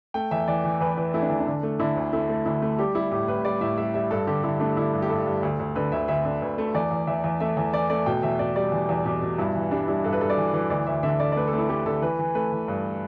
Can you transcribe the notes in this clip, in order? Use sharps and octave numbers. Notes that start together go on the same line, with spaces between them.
A3 G5
E2 E5
E3 D5
E3
E2 B4
E3 B4
A3 E4
D4
E2
D4
D3
A3
D3 E4
D2
A3 E4
A3
D2 E4
A3
G3 G4
G3 E4
A2 G4
A2 B4
G3 D5
A2 E5
G3 E5
G3 E5
G2 A4
D3 G4
D3 E4
A3 D4
D3 E4
G2
G4
G2 A4
G2
D2
D2
D3 B4
D2 E5
D2 E5
D3
D2 B4
A3
E2 D5
E2
E2 E5
E2
A3 E5
E2
E3 D5
A3 D5
B2 G5
E2 E5
B2 D5
G3 D5
E2
E2
B2 G4
B2
G2 E4
E3
G3 D4
G3 E4
G2 A4
B4
G2 A4
D5
E3
E3
D2 D5
D2 E5
D3 E5
D3 D5
D5
A3 B4
A4
A3
E4
A3 G4
D3 A4
E3 B4
E3
A3 B4
E3
G2